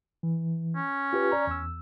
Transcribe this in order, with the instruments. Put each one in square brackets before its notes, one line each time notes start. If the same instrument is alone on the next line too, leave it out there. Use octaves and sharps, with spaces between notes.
[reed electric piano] E3
[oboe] C#4
[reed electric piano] F4 G4 B4
D5 A#5
E2 E6